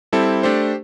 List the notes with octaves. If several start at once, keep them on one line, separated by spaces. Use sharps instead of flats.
G3 C4 E4 A4
A3 D4 G4 C5